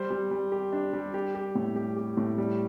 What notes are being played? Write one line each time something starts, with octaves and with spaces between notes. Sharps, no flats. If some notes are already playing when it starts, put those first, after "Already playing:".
Already playing: G3 C5
G3
G3
G4
D4
G3
G4
G4
A2
G4
G4
A2
G3